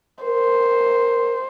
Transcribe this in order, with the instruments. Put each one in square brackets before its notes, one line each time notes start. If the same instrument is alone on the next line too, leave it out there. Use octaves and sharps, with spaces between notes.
[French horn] A#4 [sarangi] C5